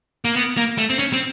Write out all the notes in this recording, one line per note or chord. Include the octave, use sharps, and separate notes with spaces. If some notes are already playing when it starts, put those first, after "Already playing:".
A#3
B3
A#3
A3
C4
C#4
C4